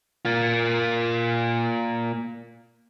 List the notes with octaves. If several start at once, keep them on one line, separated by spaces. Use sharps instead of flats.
A#3 F4